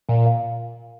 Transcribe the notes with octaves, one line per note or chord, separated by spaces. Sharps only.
A#2 F5
F5